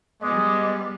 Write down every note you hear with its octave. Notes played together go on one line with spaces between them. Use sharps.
G3 G#3 B3 D#5 D6